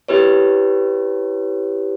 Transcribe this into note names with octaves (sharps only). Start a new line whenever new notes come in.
E4 G4 B4 C#5